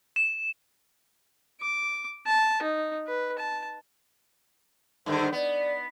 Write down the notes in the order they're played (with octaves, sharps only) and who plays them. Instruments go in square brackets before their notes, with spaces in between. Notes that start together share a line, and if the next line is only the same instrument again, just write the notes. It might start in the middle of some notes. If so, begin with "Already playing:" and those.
[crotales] E7
[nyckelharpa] D6
A5
D#4
B4
A5
[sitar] G2 D3 D#3 [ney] C5
[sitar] B3 [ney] D5